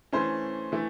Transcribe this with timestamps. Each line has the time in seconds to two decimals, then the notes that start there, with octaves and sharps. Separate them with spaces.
0.13 E3 A3 C#4 C5
0.72 E3 A3